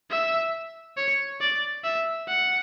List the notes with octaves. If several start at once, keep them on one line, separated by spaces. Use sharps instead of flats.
E5
C#5
D5
E5
F#5